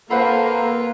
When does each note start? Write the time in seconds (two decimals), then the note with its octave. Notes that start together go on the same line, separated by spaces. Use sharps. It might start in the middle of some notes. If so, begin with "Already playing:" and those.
0.11 F2 A#3 F4 A4 B4 C5 F#5 B5